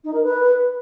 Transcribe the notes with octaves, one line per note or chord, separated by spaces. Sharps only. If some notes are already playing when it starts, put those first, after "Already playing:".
D#4
A#4
B4